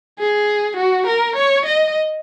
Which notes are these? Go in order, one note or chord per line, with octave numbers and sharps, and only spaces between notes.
G#4
F#4
A#4
C#5
D#5